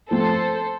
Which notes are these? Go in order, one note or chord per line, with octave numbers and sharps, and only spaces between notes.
F3 A3 C4 A4 C5